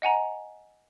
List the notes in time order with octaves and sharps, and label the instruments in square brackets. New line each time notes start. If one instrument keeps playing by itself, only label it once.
[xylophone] D#5 F#5 G#5 A#5